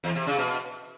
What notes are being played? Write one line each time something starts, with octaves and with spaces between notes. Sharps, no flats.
E2
C3
C#3
B2